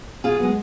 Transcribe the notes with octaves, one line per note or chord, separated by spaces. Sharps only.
B2 F4 G#4
G#3 B3